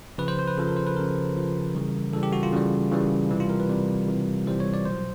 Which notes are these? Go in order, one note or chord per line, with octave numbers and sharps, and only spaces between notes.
C#3 F3 B4
C5
C5
B4
C#3 F3 A4
A#4
C5
B4
C#3 F3 A#4
C#3 F3
C#3 E3 G3
C#3 E3 G3 A4
G4
F#4
F4
C#3 E3 G3
C#3 E3 G3
C3 E3 G3
F4
A#4
B4
C3 E3 G3
C3 E3 G3
C3 E3 G3 C5
C#5
D5
B2 F#3 C5